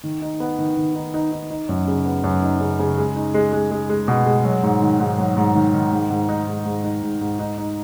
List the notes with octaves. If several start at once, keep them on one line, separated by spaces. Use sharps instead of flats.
D#3
D#4
B3
D#3
D#3
D#4
D#4
D#4
D#4
F#2
C#3
B3
F#2
D#4
C#3
C#3
G#3
D#4
G#3
G#3
G#3
G#3
B2
G#3
F#3
G#2
D#3
G#2
F#3
G#2
D#3
D#3
G#2
G#2
D#4
G#2
G#2
D#4
G#2
G#2
D#4
D#4